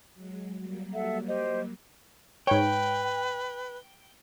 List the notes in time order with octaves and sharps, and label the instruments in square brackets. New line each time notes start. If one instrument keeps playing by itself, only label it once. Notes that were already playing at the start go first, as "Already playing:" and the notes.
[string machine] F#3 G#3
F#3 G3 A#3
[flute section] A4 E5 F#5
G4 C5 D#5
[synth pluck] G#2 C#5 [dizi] B4 [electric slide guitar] G5